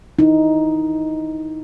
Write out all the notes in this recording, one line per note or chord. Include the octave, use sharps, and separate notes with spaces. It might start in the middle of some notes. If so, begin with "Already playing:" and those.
D#4 E4